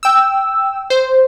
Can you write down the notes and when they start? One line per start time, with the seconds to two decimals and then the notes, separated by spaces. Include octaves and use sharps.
0.03 G5 E6
0.90 C5